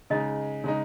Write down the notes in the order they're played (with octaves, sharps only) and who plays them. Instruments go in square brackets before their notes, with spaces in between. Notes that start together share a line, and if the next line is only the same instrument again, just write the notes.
[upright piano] C#3 G#3 D#4 [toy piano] D#5
[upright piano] C#3 G#3 D#4